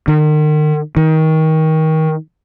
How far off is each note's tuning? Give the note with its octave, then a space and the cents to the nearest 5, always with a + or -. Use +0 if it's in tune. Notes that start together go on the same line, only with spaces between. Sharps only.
D#3 -40
D#3 +25